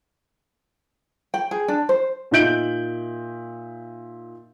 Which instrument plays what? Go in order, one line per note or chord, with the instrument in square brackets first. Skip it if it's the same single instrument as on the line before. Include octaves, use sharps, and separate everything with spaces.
[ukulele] G5
G#4
D4
C5
[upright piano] A#2 D#4 E5 G6 D7 F#7